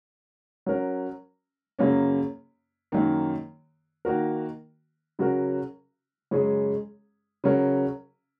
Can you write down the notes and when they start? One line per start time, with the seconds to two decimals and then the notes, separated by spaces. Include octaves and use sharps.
0.66 F#3 C#4 A#4
1.79 F#2 C#3 A#3 C#4
2.92 F#2 D#3 A#3
4.05 D#3 A#3 F#4 A#4
5.19 C#3 F#3 C#4 F#4 A#4
6.31 F#2 C#3 G#3 C#4 G#4
7.44 C#3 F#3 C#4 A#4